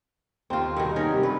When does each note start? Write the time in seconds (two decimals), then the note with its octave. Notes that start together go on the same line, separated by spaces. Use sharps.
0.50 D#2 C4 F4
0.77 G2 B2 D#3
0.96 C#4 D#4 A#4
1.11 C3 G3
1.23 G2 B4